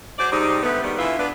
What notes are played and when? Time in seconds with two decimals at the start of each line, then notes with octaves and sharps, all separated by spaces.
0.18 F#3 G#4 C5 D5
0.32 G#2 C3 G3 C4 D#4
0.63 D3 G3 A3 B3
0.82 G#2 D#3 G3 B3
0.98 D3 E3 E4 F4 B4 E5
1.19 B3 D4 B4